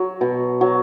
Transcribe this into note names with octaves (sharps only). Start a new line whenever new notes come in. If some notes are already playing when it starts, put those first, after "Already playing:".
Already playing: F#3
B2
F#3